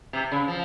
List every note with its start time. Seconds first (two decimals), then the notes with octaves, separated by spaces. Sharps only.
0.13 C3
0.31 C#3
0.48 F3